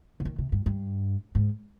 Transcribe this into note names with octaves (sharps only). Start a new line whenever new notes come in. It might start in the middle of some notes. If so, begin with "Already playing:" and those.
D3
D#3
C3
G2
G2
G#2